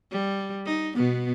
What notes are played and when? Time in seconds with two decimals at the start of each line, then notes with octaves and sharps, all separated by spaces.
0.12 G3
0.66 D#4
0.95 B2 B3